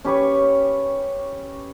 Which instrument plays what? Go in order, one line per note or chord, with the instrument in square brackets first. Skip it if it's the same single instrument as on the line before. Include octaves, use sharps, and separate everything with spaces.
[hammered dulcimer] C#4 G4 B4 C#5